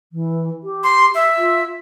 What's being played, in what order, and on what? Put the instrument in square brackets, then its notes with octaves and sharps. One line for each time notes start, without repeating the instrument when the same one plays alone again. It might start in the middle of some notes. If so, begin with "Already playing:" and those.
[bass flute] E3
G4
[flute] C6
E5
[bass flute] F4